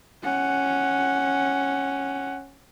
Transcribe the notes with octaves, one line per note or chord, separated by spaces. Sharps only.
C#4 F#5